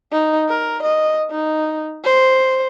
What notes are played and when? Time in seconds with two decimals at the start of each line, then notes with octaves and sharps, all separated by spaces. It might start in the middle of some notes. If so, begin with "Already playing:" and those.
0.12 D#4
0.49 A#4
0.83 D#5
1.31 D#4
2.04 C5